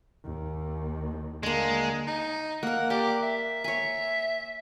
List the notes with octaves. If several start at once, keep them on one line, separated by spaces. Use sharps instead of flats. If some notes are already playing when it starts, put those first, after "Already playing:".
D#2
D3 G#3 A#3
D#4
A#3 A#4 F#5
G4 D5
E5
C#5 E5 G#5